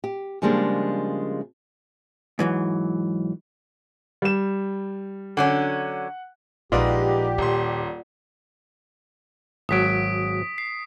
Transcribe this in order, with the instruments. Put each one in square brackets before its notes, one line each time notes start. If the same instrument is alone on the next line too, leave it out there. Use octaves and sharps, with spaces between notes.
[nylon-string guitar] G4
C#3 F3 G3 G#3 A#3 D4
[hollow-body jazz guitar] G#2 E3 F#3
[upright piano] G3 E7
[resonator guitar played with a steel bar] D3 F#3 C#4 [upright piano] F#5
[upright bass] A#1 [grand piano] G#3 D#4 B4 [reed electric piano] F4 D5 F#5 [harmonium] G4
[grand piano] D#1 C6 [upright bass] A#2
[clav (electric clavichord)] G#1 F#3 [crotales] D#6 B6 D7
[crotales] C7